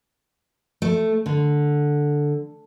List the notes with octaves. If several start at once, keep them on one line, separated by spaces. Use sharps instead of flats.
A3
D3